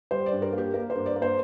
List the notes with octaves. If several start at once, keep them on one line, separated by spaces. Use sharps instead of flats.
G3 C5
D5
G2
A#4
A#3 G4
A#3 A#4
C5
G2
D5
A#3
C5